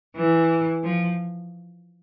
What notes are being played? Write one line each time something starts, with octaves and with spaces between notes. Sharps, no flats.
E3
F3